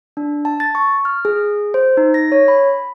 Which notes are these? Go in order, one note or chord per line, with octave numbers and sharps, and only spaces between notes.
D4
A5
A6
C#6
F6
G#4
C5
D#4
A#6
C#5
B5